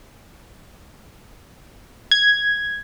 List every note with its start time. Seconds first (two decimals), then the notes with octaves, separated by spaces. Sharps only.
2.11 G#6